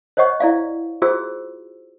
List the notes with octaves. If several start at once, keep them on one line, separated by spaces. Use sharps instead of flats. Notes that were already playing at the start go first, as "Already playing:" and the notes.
C5 C#5 D#5 F#5 C#6
E4 D5 F5
F4 F#4 G#4 C5 E6